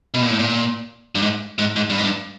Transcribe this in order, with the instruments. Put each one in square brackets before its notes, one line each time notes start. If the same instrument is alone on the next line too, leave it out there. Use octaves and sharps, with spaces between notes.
[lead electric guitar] B2
A#2
A2
A#2
G2
G#2
G#2
G#2
G2
G#2
G2